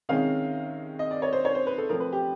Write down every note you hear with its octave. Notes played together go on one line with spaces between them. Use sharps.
C3 D#3 G#3 C#4 F5
D#5
D5
C#5
C5
C#5
C5
B4
A4
F3 A3 C4 A#4
B4
G4